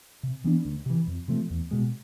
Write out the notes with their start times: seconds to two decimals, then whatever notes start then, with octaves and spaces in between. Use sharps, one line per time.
0.23 C3
0.44 E3 B3 D4
0.65 D2
0.86 C3 E3
1.07 F2
1.28 C3 F3 A3
1.50 E2
1.71 B2 G#3